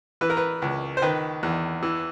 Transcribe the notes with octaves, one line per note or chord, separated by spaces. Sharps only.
E3 B4
A#4
B4
C#2
C5
D#3 B4
E2
E3